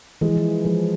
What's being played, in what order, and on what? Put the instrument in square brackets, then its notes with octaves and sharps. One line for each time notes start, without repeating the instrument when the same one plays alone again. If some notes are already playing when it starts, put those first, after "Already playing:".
[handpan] E3 [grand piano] G#3
[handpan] F3
E3
[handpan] F3 [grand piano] G#3